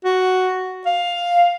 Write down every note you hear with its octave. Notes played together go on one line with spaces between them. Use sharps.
F#4
F5